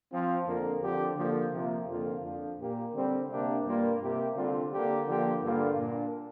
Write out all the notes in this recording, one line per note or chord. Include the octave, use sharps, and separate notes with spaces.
F3 C4 F4
F2 D3 A#3
D3 F3 C4 G4
D3 F3 A#3
C3 F3 A#3 F4
F2 D3 A#3 F4
F2 F3 D4 F4
A#2 A#3 G4
D3 G3 C4
C3 A#3 D4 G4
G2 G3 A#3 F4
C3 A#3 G4
D3 G3 C4 F4
D3 A#3 D4 G4
D3 F3 A#3 G4
G2 D3 A#3 F4
A#2 A#3 D4